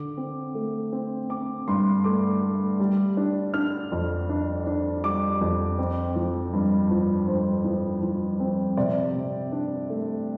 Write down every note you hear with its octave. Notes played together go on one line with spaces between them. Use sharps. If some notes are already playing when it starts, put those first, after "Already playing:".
Already playing: D3 D6
C4
A3
C4
C4 D6
G2 C6
A3 D6
A3
G3
D4
D4 F6
F2
D4
D4
G3 D6
F2
C4
F3
G2
F3
G2 C5
F3
F3
C4
C3 D5
C3
D4
A3